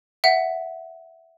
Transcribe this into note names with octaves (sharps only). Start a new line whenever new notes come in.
E5 F#5